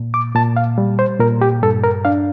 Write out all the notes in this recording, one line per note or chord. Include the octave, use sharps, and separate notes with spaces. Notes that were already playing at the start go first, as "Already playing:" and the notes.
Already playing: A#2
D6
A#2 A5
F5
G3
C5
A#2 A#4
G4
G2 A4
A#4
D4 F5